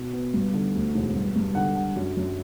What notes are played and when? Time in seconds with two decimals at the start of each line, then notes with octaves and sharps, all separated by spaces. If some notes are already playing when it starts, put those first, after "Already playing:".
Already playing: B2
0.13 B3
0.34 G2
0.54 D3
0.75 D2
0.95 E1
1.15 G2
1.36 G2
1.55 D3 F#5
1.76 D3
1.96 F#2
2.17 F#2